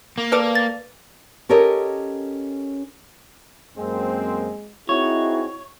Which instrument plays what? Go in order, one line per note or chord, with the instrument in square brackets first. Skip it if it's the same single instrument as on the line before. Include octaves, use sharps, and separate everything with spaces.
[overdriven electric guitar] A#3
[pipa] A4 D5 F5 [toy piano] B4
[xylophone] A6
[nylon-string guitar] C#4 G4 A4 A#4 C#5 D#5
[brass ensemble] F#2 A#3 C4 [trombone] G#3
[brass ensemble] C4 D#4 G#4 [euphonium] E4 [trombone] F#4 [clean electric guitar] C#5